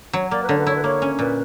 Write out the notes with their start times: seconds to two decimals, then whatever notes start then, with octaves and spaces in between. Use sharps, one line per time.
0.13 F#3 C#5
0.31 A#3 D5
0.42 B4
0.48 D3 C#5
0.57 B4
0.66 E4 C#5
0.76 B4
0.84 A#3 C#5
1.02 C#4
1.19 A#2 B4